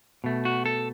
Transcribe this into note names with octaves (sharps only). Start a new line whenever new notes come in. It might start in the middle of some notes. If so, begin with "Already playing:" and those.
B2 A3
F#4
A4